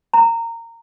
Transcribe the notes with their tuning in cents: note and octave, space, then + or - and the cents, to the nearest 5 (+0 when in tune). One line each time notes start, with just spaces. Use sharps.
A#5 -20